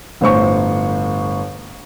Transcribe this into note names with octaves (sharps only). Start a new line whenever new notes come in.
G1 A2 C5 C#6